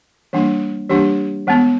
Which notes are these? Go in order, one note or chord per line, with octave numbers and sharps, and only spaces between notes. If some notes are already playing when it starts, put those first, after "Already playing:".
E3 G3 A#3 D4
E3 G3 A#3 D4 G4
E3 G#3 B3